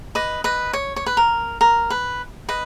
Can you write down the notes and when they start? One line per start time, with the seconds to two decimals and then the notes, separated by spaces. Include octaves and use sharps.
0.15 B4 D#5
0.44 B4 D#5
0.73 C#5
0.96 C#5
1.06 B4
1.17 A#4
1.61 A#4
1.90 B4
2.49 B4 D#5